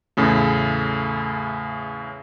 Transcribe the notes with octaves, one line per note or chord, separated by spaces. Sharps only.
E2 A2 C#3 A3